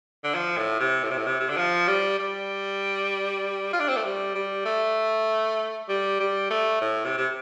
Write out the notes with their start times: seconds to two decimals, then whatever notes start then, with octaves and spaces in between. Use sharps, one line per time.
0.24 D3
0.35 F3
0.57 A2
0.80 C3
1.03 A2
1.11 C3
1.17 A2
1.26 C3
1.40 C3
1.49 D3
1.57 F3
1.88 G3
2.19 G3
3.73 F4
3.80 D4
3.89 C4
3.96 A3
4.04 G3
4.35 G3
4.65 A3
5.89 G3
6.20 G3
6.50 A3
6.81 A2
7.04 C3
7.17 C3